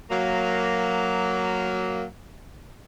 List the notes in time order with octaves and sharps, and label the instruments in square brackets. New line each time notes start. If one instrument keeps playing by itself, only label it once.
[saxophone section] F#3 A#3